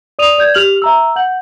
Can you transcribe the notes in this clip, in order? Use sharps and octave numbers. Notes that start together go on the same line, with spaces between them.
D5 D#6 D#7 F7
D5 G6 G#6
G4 F6 F7 F#7
E5 A#5 E6
F#5 G6 F#7